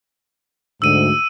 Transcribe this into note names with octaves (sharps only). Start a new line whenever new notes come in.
D2 G#2 E6 D#7